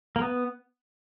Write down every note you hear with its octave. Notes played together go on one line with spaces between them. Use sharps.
A#3
B3